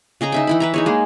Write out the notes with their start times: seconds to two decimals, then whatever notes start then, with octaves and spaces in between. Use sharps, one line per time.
0.21 C#3 G#4 D#5 A#5
0.32 D#4 E5 G5
0.47 E3 E4 B5
0.60 B4 E5 A#5
0.74 D#4 G#4 C#5
0.86 G#3 A#3